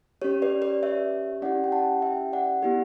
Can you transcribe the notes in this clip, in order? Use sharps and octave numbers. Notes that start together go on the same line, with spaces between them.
C#4 G4 C#5
B4 D5
B4 D5
C#5 E5
C#4 E4 G4 D5 F#5
G5
F#5 A5
E5 G5
D5 F#5
B3 E4 G4